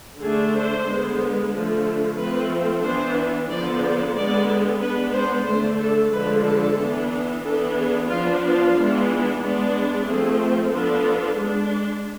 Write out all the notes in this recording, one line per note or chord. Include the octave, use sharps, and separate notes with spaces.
D3 A3 D4 G#4
C5
D3 G#3 B3
D3 F3 A3
F3 A3 C4 B4
E3 B3 D4 C5
D3 F3 B3 D5
D5
D3 G#3 B3 D5
G#3 B3 D4 B4
C5
D3 A3 D4 C5
A4
D3 F3 G#3 D4 B4
A4
E3 B3 D4
E3 B3 D4 A4
G#4
F3 B3 D4 F4
F4
E3 G#3 B3 D4
G#3 B3 D4
F3 A3 C4 G#4
F3 B3 D4 A4
G#3 D4